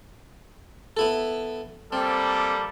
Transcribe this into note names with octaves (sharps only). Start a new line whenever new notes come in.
B3 E4 A4
G3 A#3 C4 A4